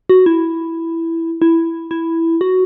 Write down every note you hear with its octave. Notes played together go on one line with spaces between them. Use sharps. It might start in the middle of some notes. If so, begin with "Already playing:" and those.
F#4
E4
E4
E4
F#4